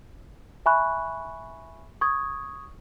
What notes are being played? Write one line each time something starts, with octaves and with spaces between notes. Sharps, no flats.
E5 G#5 B5 C#6 F#6
C#6 D#6 G#6